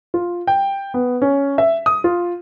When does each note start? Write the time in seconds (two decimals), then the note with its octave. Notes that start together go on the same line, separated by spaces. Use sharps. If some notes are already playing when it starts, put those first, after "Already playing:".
0.14 F4
0.47 G5
0.94 B3
1.22 C#4
1.58 E5
1.86 D#6
2.04 F4